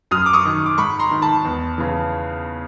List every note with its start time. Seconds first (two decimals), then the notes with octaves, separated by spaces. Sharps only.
0.11 F#2 D#6 F6
0.26 D6
0.33 C#6 D#6
0.45 D#3
0.66 D6
0.77 G#2 B5 C#6
0.99 A#5 C6
1.11 D#3
1.22 A5 B5
1.45 E2
1.78 C#3 E3